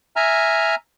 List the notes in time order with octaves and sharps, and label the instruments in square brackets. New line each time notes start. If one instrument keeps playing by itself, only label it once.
[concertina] E5 G#5 A#5 F6